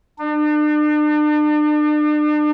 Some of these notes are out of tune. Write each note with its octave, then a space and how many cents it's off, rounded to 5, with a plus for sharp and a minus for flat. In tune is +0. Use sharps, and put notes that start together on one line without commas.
D4 +40